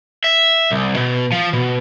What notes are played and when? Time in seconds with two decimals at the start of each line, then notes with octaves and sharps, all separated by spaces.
0.24 E5
0.72 C2
0.96 B2
1.32 F3
1.53 B2